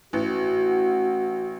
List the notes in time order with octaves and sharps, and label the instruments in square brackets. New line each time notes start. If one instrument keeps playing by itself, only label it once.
[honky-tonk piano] A1 [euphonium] F#4